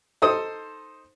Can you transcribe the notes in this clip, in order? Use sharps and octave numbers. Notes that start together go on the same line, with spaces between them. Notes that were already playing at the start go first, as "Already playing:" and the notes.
D#4 A4 C5 D#6